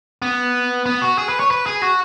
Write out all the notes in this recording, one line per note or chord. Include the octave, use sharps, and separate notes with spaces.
B3
B3
F#4
G#4
B4
C#5
B4
G#4
F#4